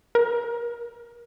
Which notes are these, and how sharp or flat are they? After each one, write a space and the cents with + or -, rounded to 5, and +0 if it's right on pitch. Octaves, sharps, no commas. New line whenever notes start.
A#4 +30